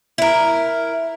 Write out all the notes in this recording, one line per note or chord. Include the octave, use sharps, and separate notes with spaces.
E4 A#4